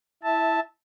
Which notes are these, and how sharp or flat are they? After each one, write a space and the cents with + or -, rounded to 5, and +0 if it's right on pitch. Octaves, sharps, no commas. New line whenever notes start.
E4 +0 E5 -15 A5 +0